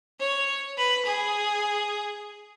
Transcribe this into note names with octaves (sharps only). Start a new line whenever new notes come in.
C#5
B4
G#4